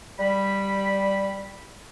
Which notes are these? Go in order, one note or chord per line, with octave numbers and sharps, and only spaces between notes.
G3 B5